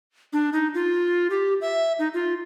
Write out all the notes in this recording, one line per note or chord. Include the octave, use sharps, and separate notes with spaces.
D4
D#4
F4
G4
E5
D#4
F4